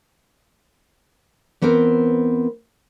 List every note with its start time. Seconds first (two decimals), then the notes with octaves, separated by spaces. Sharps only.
1.62 E3 B3 C4 A#4 C5